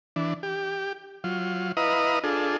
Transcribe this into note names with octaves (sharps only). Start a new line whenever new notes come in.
E3 D4
G4
F#3 F4
E4 B4 D#5 F5 A#5 D#6
D4 F4 G#4 A4